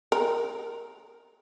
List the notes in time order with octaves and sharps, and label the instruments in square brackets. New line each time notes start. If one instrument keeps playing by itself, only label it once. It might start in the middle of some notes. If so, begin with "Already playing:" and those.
[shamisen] A#4